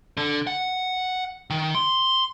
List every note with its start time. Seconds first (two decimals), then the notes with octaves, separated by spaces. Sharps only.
0.17 D3
0.47 F#5
1.50 D#3
1.75 C6